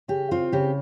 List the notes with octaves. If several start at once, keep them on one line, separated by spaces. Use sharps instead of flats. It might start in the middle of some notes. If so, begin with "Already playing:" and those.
C#3 G4
C4 F4
C#3 G4